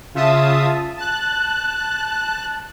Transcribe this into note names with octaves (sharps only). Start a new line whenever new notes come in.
C#3 F4 E5 A5 D#6
A5 F#6